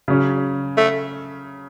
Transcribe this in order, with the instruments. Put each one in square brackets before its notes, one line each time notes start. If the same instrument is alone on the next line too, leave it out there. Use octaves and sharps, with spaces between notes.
[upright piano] C#3 F#3 C#4
[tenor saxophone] A3